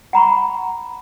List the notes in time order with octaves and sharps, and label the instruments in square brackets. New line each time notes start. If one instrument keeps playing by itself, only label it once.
[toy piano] F#5 A#5 B5 C#6